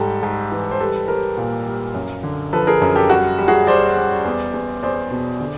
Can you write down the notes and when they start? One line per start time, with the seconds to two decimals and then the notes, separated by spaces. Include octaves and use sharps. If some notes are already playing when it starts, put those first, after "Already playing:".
Already playing: G#2 G3 G4 A4
0.23 G#2
0.52 E3
0.71 C5
0.79 G3 A4 B4
1.08 G3 A#4 C5
1.37 A#2
1.66 G3
1.94 F#2
2.23 D3
2.53 F3 A4 B4
2.67 G#4 A#4
2.82 F#2
2.96 G4 A4
3.10 G3 F#4
3.38 G3
3.48 F#4 G#4
3.67 G3 C5 D5
3.96 G3
4.25 E2
4.54 E2
4.83 E2 C5 D5
5.11 B2
5.40 D3